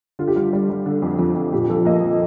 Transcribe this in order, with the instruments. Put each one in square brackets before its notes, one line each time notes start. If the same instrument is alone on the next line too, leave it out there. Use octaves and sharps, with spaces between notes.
[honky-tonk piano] D3 F4
G4
G3 F4
G3
G3
D3
F2
F2
F2
A#2 G4
F3 A4
A#3 D#5
F3